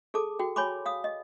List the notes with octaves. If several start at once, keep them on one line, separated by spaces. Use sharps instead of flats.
G#4 A4 A5 D6
F#4 G5
C#5 G#5 B5 C6 D6
F5 D#6
D#5